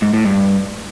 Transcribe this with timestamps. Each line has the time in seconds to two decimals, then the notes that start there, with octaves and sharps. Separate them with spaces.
0.02 G#2
0.14 A2
0.25 G2